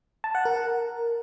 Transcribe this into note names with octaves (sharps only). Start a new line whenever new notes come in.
A5
F#5
A#4